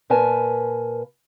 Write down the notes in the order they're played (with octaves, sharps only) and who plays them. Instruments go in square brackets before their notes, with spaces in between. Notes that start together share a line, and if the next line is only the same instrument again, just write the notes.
[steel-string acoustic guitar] A#2 A#4 B4 G#5 A5